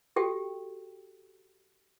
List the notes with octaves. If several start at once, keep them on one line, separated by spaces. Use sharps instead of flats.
F#4 G4 A4 G5